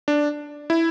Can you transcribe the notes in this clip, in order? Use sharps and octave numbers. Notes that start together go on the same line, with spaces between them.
D4
E4